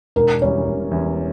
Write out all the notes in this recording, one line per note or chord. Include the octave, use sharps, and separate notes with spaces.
E1 A#4
E2 E3 G3 C#4 C#5
E1
E2 E3 G3 C#4